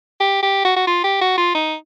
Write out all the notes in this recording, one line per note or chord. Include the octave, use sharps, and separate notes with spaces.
G4
G4
F#4
F#4
F4
G4
F#4
F4
D#4